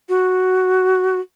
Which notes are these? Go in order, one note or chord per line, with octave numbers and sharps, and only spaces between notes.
F#4